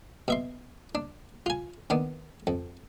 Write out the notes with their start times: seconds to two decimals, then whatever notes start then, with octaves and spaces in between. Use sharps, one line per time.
0.28 B2 E5 C6
0.95 D4
1.46 F4 G#5
1.90 D#3 B3 D4
2.47 F2